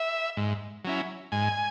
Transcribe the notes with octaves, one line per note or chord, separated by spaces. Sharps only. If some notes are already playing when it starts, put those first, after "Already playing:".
Already playing: E5
G#2
F#3 C#4 E4
G#2 G#5